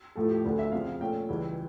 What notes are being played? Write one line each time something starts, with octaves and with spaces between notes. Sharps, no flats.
A2 F3 A3 A4
G4
D2 D3 A3 D4
E5
F2 C#3 F3 F5
F5
A#2 A3 C#4 G5
C#2 C#3 E3 G3